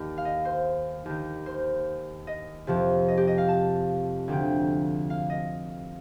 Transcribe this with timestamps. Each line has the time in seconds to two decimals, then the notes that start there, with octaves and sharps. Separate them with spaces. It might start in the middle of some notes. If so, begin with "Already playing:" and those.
Already playing: D#2 D#3 D5
0.18 F5
0.25 D#5
0.45 C5
1.06 D#2 D#3
1.46 C5
2.27 D#5
2.67 F2 C3 F3
3.08 D#5
3.17 G4
3.27 D#5
3.38 F5
3.49 A5
4.28 D2 D3 F3 G5
5.10 F5
5.30 D#5